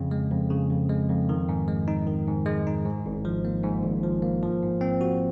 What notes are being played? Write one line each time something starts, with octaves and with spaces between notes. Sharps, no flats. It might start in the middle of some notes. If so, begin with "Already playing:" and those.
Already playing: F2 C#3
G#3
F2
C#3
F2
G#3
F2
D#3
G#2
G#3
D#4
D#3
G#2
G#3
D#4
G#2
G#1
F3
A#3
G#2
G#1
F3
A#3
F3
G#2
C4
F#4